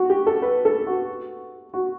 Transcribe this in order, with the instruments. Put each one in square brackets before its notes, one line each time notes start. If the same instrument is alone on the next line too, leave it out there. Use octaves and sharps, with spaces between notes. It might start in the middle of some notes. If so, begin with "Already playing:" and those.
Already playing: [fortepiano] F#4
G4
A4
B4
A4
F#4
F#4